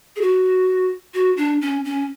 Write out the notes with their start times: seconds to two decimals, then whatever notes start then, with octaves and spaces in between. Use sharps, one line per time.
0.16 G#4
0.21 F#4
1.14 F#4
1.37 D4
1.61 C#4
1.85 C#4